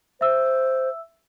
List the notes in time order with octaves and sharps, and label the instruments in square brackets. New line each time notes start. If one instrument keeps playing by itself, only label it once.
[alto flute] C5 [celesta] E5 E6